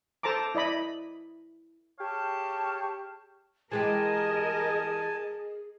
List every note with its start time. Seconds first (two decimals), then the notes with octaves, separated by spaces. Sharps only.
0.23 A4 C5 A5 A#5 D6
0.55 E4 D5 D#5 B5
2.00 G4 G#4 C#5 F5 A5
3.72 E3 G#3 G4 G#4 A#4 D#5 G#5 A5